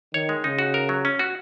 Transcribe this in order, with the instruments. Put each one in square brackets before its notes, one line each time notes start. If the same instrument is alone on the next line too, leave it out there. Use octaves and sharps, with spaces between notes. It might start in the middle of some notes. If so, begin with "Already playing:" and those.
[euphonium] D#3 [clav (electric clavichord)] C#5
[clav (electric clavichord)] G#3
[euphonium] C#3 [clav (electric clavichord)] D#4
[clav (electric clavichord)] F#4
A#4
F#3
C#4
F#4